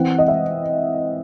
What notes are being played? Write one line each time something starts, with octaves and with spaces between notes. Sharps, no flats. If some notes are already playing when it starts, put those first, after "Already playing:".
Already playing: E3 C4 F#5
D#5
E5